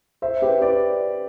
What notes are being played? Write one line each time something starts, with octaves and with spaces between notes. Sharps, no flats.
C5 E5
G4 B4
B4 D5